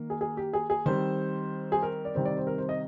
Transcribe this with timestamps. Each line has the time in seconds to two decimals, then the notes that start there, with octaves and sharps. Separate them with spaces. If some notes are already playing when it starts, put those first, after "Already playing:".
Already playing: D#3 A#3
0.10 G#4
0.21 G#4
0.37 G4
0.53 G#4
0.70 G#4
0.86 D#3 G3 C4 C5
1.72 G#4
1.83 A#4
2.05 D5
2.15 C3 D#3 G3 C4 C5
2.25 D5
2.37 C5
2.47 A#4
2.58 C5
2.69 D#5